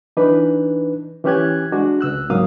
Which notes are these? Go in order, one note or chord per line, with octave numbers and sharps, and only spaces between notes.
E3 D4 D#4 B4
E3 C#4 G4 F#6 G#6
G#3 D4 F#4
C#2 E6 F#6
C#2 G#2 F#3 A#3 F5 D#6